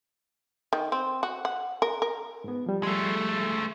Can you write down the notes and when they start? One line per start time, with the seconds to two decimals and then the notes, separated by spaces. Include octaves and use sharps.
0.73 D#3
0.92 C4
1.23 F#4
1.45 F#5
1.82 A#4
2.02 A#4
2.44 G#2 B3
2.66 F3 G3
2.83 G#3 A3